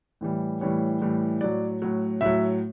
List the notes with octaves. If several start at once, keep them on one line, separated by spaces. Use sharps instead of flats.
A2 E3 G3
A2 E3 G3 C#5
A2 E3 G3
A2 F#3 D5
A2 F#3
A2 F#3 E5